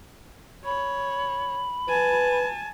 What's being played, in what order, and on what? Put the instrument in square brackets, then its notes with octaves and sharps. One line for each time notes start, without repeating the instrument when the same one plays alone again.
[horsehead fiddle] C#5 [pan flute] B5
[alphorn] B4 [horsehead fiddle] G#5 A5